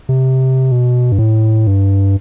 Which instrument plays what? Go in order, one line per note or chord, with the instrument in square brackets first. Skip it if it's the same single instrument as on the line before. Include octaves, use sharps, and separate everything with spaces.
[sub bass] C3
B2
G2
A2
G2